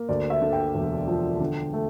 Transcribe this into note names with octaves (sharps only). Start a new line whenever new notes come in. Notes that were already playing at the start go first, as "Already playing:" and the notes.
Already playing: A#3
D2 D5
E5
D3
G5
E1
F3
D3
A3